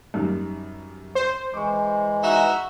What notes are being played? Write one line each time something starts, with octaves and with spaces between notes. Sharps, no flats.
F#2 D#3 G3
C5
E3 G#3 C#6 D6
D#4 F#4 E5